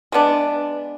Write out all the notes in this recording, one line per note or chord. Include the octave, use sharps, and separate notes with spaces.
G#3 B3 D4